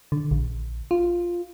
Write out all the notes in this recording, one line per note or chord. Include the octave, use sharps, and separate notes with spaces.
D3
A#1
F4